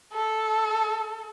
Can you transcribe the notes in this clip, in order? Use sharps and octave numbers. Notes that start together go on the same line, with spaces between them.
A4